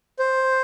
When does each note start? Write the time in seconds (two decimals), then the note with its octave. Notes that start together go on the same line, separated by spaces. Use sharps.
0.19 C5